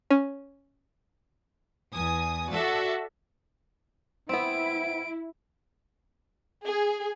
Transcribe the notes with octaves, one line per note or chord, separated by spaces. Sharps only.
C#4
E2 G#5 D#6
F#4 A4 D5 E5
B3 C4 E4 D7
G#4